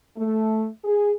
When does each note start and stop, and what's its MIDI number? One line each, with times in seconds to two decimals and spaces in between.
0.17 0.68 57
0.85 1.12 68